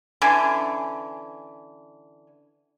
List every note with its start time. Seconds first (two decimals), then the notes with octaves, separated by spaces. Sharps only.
0.22 D3 E3 C#4 G#5